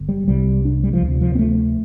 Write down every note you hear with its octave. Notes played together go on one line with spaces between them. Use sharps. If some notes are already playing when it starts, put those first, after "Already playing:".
Already playing: G1 G2 D3
G3
C2 C3 G3
D4
G3
F3
D2
C3
F3
C4
A3